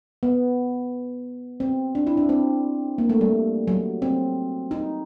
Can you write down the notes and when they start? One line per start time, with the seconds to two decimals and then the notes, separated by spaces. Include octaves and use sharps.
0.23 B3
1.60 C4
1.95 D4
2.07 E4
2.17 D4
2.29 C4
2.98 A#3
3.09 A3
3.21 G3
3.68 F#3
4.02 C4
4.71 D#4